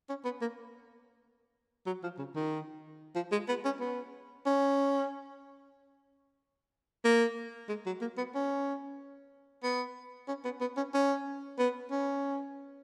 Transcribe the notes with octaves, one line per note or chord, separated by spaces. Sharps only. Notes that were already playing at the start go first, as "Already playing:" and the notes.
C#4
B3
A#3
F#3
F3
C#3
D#3
F3
G#3
B3
C#4
B3
C#4
A#3
G#3
F#3
A#3
B3
C#4
B3
C#4
B3
B3
C#4
C#4
B3
C#4